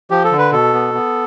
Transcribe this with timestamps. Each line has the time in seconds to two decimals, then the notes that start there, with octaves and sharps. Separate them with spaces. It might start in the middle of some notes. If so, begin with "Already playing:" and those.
0.10 F3 G4
0.24 A4
0.31 D3
0.38 B4
0.52 B2 A4
0.73 B3
0.94 B3